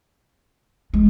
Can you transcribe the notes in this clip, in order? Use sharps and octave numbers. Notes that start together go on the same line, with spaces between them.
G#3